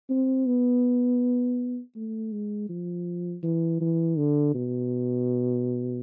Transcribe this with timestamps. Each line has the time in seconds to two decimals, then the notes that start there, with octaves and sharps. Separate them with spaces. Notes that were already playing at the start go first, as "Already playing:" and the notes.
0.10 C4
0.46 B3
1.96 A3
2.32 G#3
2.69 F3
3.43 E3
3.81 E3
4.18 D3
4.54 B2